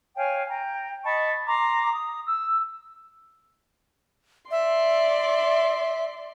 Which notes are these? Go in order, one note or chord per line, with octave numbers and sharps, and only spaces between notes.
C#5 F5 G5 G#5
G5 A#5
D#5 A5 B5 C#6
A#5 C6 D6
D#6
E6
D5 E5 C6